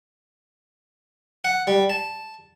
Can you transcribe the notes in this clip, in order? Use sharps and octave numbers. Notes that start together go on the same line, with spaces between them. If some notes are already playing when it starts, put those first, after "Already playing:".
F#5
G3
A5